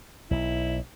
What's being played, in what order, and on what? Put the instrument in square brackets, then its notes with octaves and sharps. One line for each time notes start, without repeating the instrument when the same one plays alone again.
[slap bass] B1 [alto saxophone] E4